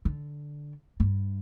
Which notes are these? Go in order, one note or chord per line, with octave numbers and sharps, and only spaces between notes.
D3
G2